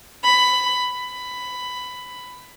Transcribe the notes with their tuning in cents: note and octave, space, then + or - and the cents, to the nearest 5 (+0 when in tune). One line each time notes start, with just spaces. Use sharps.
B5 +10
B5 +15